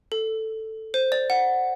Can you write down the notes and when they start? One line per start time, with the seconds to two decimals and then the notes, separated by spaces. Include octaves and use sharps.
0.12 A4
0.94 C5
1.12 D5
1.30 F#5